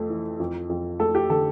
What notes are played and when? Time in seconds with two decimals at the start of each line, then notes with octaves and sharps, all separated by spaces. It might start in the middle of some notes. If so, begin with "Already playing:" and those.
Already playing: F2 A3
0.09 E3
0.40 F2
0.69 F2
1.00 A3 A4
1.15 G4
1.30 D3 A4